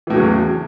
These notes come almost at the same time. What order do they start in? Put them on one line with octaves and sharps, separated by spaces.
E3 A2 F#3 C#3 E2